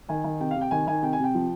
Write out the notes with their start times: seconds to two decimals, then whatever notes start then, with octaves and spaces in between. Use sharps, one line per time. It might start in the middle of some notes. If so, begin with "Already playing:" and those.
0.09 D#3 G#5
0.24 D#3
0.40 C3 G5
0.51 F5
0.56 C3
0.61 G5
0.71 D#3 G#5
0.87 D#3 G#5
1.02 C3 G5
1.13 G#5
1.19 C3 G5
1.34 F3